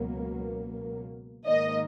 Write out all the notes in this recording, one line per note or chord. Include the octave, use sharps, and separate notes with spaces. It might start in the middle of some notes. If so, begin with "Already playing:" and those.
Already playing: C#2 B2 F#3 A#3
G#2 D#3 A#3 D#5